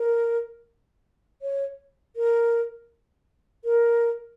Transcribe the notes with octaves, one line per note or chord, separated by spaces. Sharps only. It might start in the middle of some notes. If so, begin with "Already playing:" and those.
Already playing: A#4
C#5
A#4
A#4